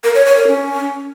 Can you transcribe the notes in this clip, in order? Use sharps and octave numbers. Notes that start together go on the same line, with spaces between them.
A#4
C#5
C#5
A#4
C#4